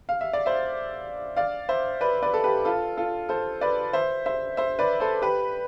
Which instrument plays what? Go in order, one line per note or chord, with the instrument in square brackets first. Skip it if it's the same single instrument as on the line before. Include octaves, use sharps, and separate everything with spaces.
[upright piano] F5
E5
D5
C5 E5
D5 F5
C5 E5
B4 D5
B4 D5
A4
G4 B4
F4 A4
F4 A4
A4 C5
B4 D5
C5 E5
C5 E5
C5 E5
B4 D5
A4 C5
G4 B4